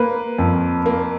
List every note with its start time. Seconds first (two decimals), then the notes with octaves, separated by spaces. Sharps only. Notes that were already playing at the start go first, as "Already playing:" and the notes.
Already playing: A#3 B4
0.38 F2
0.86 A#3